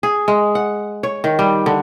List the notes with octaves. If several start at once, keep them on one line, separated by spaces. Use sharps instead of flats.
G#4
G#3
F#5
C#5
D#3
G3
D3